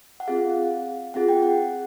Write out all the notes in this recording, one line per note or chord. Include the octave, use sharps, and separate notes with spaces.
F#5
C4 F4 G#4 F5
C4 F4 G#4 F#5
G5
F#5